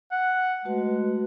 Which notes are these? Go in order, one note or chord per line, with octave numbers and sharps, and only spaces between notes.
F#5
G#3 A3 F#4 B4